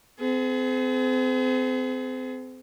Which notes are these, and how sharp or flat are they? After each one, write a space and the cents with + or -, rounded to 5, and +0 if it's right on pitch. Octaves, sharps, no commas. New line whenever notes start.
C4 -35 G#4 +35